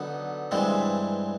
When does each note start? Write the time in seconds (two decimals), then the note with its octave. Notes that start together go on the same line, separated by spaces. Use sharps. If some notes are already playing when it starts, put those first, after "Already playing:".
Already playing: D3 F#3 B3 D#4
0.51 G2 E3 G#3 C4